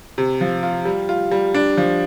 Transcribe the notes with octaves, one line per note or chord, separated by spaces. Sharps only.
C3
F3
F4
G3
F4
G3
D4
F3